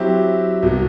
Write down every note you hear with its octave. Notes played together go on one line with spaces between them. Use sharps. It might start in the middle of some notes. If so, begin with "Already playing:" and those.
Already playing: F#3 C4 E4 G4
C2 B2 F#3